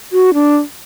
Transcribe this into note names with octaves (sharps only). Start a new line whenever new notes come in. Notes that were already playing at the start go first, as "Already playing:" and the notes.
F#4
D4